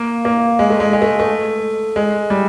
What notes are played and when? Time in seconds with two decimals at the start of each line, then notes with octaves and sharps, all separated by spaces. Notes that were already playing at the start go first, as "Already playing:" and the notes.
Already playing: A#3
0.25 A#3
0.59 G#3
0.70 A3
0.80 G#3
0.93 G#3
1.02 A3
1.20 A3
1.96 G#3
2.30 G3